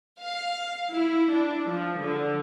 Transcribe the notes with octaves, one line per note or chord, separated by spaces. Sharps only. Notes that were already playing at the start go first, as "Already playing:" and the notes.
F5
E4
D4
F3
D3